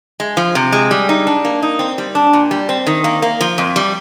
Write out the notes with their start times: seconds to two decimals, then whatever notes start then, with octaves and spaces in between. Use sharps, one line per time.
0.20 G#3
0.37 F3
0.55 C3
0.72 G#3
0.91 G3
1.09 D#4
1.27 D4
1.45 A#3
1.62 D#4
1.79 C4
1.98 G3
2.15 D4
2.33 A#2
2.51 G3
2.69 C4
2.87 D#3
3.04 A#3
3.22 A#3
3.41 F3
3.58 F2
3.76 G3